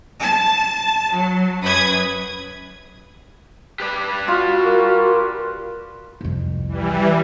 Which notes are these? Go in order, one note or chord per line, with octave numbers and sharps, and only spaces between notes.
A5
F#3
F#2 B4 B5 D#6 G#6
G4 B4 D5
F4 F#4
A#4
C2 F2
E3 G3